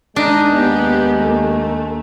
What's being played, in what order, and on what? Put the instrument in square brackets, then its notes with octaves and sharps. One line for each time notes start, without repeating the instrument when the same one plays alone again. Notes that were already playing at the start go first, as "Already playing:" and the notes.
[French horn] G#3 [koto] D4 [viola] D#4 D#5
[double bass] D#2 A#3 [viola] B3 G4
[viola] A3